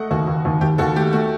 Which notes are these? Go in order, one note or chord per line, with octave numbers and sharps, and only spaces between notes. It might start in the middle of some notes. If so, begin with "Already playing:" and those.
Already playing: A3 D#5 F#5
D#2 F#4
D#2
D#2
D#2 G4
D#2 F#4 A4
A3 G4
A3 F#4